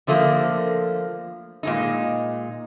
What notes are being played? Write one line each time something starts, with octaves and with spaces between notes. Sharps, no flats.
D3 F3 A3 A#3
A#2 G#3 D#4